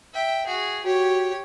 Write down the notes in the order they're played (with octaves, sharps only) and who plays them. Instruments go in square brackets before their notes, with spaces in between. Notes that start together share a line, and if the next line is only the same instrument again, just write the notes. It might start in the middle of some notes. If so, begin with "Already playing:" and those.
[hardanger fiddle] E5 G5
F#4 G#4
[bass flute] F#4 [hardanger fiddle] G4 C#5